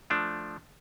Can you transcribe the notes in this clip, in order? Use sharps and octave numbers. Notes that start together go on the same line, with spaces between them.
F3 A3 D4